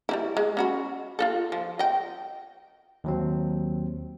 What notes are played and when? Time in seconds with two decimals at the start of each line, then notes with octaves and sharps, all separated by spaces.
0.09 G3 D#4 E4
0.37 G#3
0.57 C#4 F#4 B5
1.19 F4 F#4 A4
1.52 F3
1.79 D#5 G5
3.04 D#2 F#3 C4